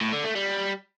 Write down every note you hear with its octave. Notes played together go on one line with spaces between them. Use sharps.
A2
D3
A3
G3